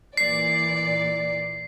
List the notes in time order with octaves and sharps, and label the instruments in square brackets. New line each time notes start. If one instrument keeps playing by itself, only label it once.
[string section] A#2 E3 D5 [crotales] C7